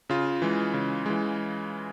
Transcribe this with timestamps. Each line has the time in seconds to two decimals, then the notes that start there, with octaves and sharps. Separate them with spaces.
0.10 C#3 F4
0.42 E3 G#3
0.74 C#3
1.06 E3 G#3